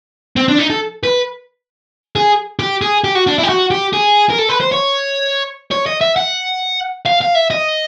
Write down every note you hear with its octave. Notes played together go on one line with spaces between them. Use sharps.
C4
D4
D#4
A4
B4
G#4
G4
G#4
G4
F#4
D4
E4
G4
F#4
G4
G#4
A#4
A4
B4
C5
C#5
C#5
D#5
E5
F#5
F5
F5
E5
D#5